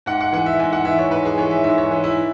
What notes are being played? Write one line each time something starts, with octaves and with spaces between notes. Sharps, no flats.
G#2 F#5
F#5
E3 F#5
E5
G#2 G#5
F#5
E3 E5
C#5
G#2 B4
G#4
E3 C#5
E5
G#2 E5
C#5
E3
E4